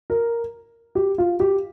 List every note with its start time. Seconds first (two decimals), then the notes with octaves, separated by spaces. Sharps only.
0.10 A#4
0.95 G4
1.18 F4
1.40 G4